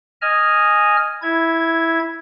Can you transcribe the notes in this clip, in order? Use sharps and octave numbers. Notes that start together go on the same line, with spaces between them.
D#5 G#5 F6
E4 G#6